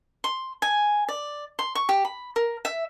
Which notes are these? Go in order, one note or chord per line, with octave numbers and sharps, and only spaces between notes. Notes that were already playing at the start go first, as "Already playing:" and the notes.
C6
G#5
D5
C6
C#6
G4
B5
A#4
E5